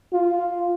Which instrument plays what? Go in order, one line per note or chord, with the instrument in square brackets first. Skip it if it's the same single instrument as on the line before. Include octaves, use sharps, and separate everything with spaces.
[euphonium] F4